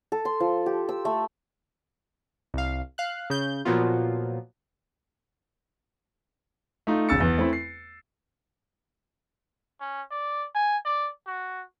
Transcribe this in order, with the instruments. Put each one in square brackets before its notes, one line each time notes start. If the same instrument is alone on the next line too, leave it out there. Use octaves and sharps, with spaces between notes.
[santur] A4
C6
F3
G4
E6
A3
[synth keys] C2 F5
F5 F#6
C#3 G6
A#2 F3 F#3 A#3 B3 F4
[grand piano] A3 D#4 F4
E1 C#3 E6 A6 C#7
E2 E3
A3 C4 E4
C7
[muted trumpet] C#4
D5
G#5
D5
F#4